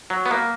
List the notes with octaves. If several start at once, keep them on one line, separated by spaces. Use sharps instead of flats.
F#3
B3
A#3